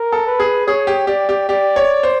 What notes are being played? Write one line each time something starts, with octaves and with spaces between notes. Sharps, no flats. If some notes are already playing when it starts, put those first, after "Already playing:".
Already playing: A#4
A4
B4
G#4
G#4 C#5
G4
G4 D5
G4
G4 D5
C#5
C5